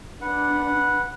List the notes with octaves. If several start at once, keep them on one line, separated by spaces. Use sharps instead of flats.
D4 B4 F#5